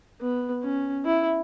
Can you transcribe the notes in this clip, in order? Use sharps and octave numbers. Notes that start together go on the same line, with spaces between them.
B3
C#4
E4